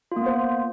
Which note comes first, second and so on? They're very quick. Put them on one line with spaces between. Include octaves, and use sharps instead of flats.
F4 A#3 B3 C5